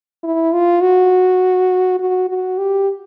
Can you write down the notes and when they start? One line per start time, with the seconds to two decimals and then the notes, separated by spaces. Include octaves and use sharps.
0.24 E4
0.53 F4
0.82 F#4
2.00 F#4
2.29 F#4
2.58 G4